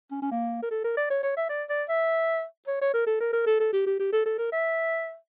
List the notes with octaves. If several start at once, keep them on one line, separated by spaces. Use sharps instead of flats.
C#4
C#4
A#3
A#4
A4
A#4
D5
C#5
C#5
E5
D5
D5
E5
C#5
C#5
A#4
A4
A#4
A#4
A4
A4
G4
G4
G4
A4
A4
A#4
E5